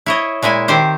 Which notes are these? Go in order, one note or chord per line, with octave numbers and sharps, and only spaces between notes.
E4 C#5 D#5
A#2 G#3 E4 G#5
D#3 C4 G4 C5